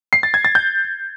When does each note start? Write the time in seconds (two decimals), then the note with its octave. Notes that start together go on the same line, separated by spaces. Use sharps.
0.13 C7
0.23 A6
0.34 G#6
0.45 A6
0.55 G6